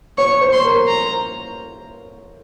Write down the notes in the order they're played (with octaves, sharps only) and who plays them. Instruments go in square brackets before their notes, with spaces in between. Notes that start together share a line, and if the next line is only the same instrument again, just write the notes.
[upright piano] C#5 [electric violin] C#6
[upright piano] C5
[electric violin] C6
[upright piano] A#4
[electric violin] A#5